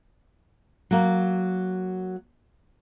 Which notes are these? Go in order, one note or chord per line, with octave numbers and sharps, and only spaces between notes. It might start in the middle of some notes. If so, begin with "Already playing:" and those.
F#3 A#3